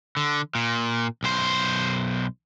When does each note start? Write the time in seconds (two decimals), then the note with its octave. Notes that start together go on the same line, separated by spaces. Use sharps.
0.17 D3
0.55 A#2
1.23 B1 C5